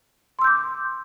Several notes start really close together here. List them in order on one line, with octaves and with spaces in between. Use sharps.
C6 E6 G6 D6